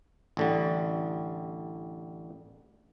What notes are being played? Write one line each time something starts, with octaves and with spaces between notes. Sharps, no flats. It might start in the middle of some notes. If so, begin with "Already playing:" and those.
A1 D3 G3